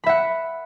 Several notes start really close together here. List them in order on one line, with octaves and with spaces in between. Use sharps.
B5 E5 F#5